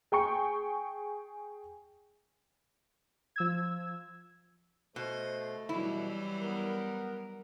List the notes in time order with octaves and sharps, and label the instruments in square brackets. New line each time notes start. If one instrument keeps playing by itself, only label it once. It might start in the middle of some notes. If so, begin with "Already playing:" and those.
[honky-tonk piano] G#4 G5 C#6 C#7
[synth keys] F3 E6 G#6
[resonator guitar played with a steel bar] B2 [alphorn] A3 [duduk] C5 [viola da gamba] D#5
[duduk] B2 [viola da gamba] E3 F#3 G3 [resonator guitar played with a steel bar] E4
[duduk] B3 [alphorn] A#4